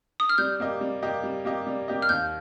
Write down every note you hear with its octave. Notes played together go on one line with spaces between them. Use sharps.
D#6
F6
G3 G6
A#3 G4 D#5
G3
A#3 G4 D#5
G3
A#3 G4 D#5
G3
A#3 G4 D#5
F6
D#2 G6